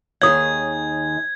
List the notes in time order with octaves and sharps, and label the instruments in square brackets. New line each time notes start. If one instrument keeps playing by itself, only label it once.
[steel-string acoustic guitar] D#2 D#3 G#4 [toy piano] C#5 D#6 [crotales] G#6